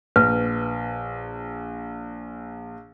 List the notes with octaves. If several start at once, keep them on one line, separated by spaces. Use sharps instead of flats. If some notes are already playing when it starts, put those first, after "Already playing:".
A#1 B4